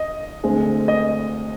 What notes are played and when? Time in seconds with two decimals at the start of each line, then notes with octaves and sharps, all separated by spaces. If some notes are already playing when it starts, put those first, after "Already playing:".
Already playing: D#5
0.44 D2 D3 G#3 C4
0.88 D#5